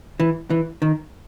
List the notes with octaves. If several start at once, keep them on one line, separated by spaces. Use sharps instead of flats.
E3
E3
D#3